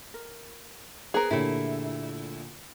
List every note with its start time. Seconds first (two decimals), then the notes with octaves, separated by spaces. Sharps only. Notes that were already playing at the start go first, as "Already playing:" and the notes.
0.14 A#4
1.14 B3 G#4 A#4 C5 A#5
1.31 A#2 D3 A3 E4 G4 C#5